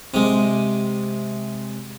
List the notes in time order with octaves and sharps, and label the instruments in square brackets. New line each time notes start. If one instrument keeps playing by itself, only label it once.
[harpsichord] C3 G#3